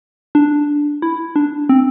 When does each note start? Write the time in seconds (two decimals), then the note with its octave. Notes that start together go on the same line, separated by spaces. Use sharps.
0.35 D4
1.02 E4
1.36 D4
1.69 C4